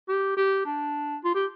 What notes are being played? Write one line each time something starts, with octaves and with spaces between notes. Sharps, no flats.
G4
G4
D4
F4
G4